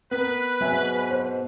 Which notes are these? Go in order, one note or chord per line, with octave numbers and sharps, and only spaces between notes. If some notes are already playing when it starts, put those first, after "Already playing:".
B3 A#4 B4
G#2 B2 F#3 E5 G#5
C5